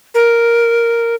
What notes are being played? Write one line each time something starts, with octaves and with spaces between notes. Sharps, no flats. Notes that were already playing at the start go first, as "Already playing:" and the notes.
A#4